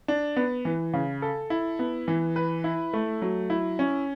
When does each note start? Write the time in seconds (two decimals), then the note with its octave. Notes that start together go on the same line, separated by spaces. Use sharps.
0.08 D4
0.36 B3
0.65 E3
0.94 C#3
1.22 A4
1.50 E4
1.79 B3
2.08 E3
2.36 B4
2.64 E4
2.93 A3
3.22 F#3
3.50 E4
3.79 C#4